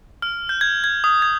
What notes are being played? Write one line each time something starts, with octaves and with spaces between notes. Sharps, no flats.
F6
G6
G#6
G#6
D#6
G#6